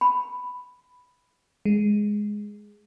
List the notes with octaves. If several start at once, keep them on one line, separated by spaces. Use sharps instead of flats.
B5
G#3